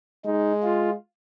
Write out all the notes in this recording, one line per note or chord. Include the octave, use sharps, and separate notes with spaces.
G#3 D#4
F4